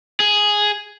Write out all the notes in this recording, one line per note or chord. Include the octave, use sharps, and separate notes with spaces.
G#4